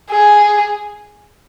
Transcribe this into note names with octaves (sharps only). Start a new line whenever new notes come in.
G#4